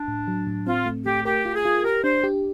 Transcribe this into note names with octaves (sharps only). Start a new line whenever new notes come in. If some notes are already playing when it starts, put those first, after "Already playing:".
Already playing: D4
A2
F#3
A2
C4 F4
A3
A3 G4
G4 A#4
F4
G#4
F4
G4 A#4
D4 C5
G4